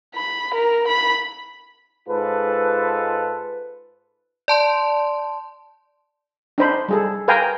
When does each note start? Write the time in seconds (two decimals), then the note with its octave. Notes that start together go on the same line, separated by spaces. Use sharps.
0.15 B5
0.54 A#4
0.88 B5
2.08 G#2 F4 A4 B4
4.48 D5 A5 C6
6.58 D4 D#4 C5 B5
6.88 G3 G#4 A4
7.28 A#4 B4 F5 G5 G#5 A#5